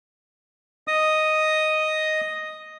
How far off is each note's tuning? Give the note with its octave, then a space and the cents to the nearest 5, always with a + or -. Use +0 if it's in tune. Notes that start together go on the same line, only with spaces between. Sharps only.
D#5 +0 D#6 +0